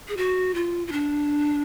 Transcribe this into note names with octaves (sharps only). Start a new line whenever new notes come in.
G#4
F#4
F4
F4
D4